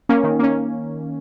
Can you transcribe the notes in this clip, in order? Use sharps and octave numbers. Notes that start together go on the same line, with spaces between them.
A#3 C#4
D#3
A#3 C#4